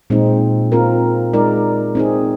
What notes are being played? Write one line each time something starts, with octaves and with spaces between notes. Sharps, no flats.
A#2 G#3 C4 D#4
C4 F4 A#4
G#3 D#4 A#4 D5
C4 D#4 G#4